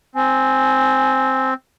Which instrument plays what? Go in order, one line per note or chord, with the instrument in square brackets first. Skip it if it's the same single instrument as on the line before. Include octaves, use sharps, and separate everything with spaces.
[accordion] C4 [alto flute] G#5